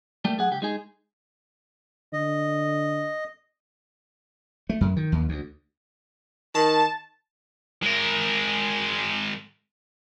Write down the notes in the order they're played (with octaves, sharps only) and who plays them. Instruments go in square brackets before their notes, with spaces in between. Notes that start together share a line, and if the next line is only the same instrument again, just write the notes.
[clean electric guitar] G3 A3 A#3 G4
F#2 G#4 F#5
C#2 G4
G#3 D#4 G#4
[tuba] D3 [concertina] D#5
[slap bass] A3
F#2
D#3
D#2
D2
[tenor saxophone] D#3 [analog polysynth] A5
[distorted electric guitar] G#3 A#4